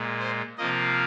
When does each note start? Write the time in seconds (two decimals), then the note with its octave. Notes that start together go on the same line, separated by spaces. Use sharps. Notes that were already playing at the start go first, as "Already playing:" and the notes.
Already playing: A#2 G#3
0.20 C5
0.58 C3 F3 A#3 D#5